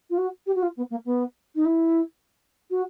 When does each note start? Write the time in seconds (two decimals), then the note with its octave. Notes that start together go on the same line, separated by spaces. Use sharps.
0.10 F4
0.18 F#4
0.46 G4
0.55 F#4
0.62 F4
0.77 B3
0.91 A#3
1.05 B3
1.55 D#4
1.65 E4
2.70 F#4